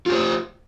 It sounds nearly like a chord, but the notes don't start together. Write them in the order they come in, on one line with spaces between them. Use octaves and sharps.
F4 G4 C5